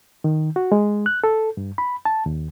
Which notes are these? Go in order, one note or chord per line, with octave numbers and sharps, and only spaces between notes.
D#3
F#4
G#3
F#6
A4
G2
B5
A5
D#2